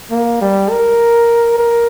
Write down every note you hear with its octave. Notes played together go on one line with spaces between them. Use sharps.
A#3
G3
A#4
A#4